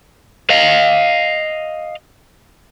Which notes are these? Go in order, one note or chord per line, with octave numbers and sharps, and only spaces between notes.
D#5 F5